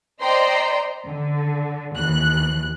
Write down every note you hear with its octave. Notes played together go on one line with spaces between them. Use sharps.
C5 D5 D#5 G5 A#5 C6
D3
D#2 E3 F#6